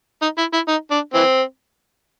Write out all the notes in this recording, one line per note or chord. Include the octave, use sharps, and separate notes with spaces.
D#4
E4
E4
D#4
D4
E3 C4